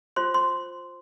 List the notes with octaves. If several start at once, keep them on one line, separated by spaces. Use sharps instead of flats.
F4 C5 C6
C6